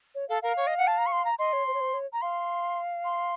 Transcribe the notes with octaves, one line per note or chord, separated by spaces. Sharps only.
C#5
A4 F5
A#4 F5
C#5
D#5
F#5
A5
A#5
C#6
C6
A#5
D#5 C6
C#5
C5
C#5
C5
C#5
A#5
F5 C6
C6